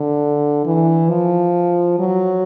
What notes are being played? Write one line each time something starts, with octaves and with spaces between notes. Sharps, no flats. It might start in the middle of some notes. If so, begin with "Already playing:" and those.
Already playing: D3
E3
F3
F#3